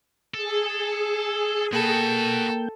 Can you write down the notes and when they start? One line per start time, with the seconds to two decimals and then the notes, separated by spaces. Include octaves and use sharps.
0.34 G#4 A4
1.73 A#3 F#4 A4 B4 G5